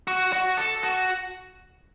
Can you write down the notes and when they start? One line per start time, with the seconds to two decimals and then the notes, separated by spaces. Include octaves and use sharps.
0.08 F#4
0.33 F#4
0.57 A4
0.83 F#4